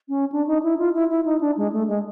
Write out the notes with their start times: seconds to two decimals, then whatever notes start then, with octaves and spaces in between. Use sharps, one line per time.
0.09 C#4
0.32 D4
0.47 D#4
0.63 E4
0.79 F4
0.94 E4
1.10 E4
1.25 D#4
1.41 D4
1.57 G#3
1.72 A3
1.88 G#3